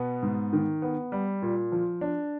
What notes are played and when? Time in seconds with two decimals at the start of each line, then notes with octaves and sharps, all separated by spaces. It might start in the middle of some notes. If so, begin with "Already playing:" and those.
Already playing: B2 B3
0.22 G#2
0.53 D#3
0.82 B3
1.12 G3
1.42 A#2
1.72 F3
2.01 D4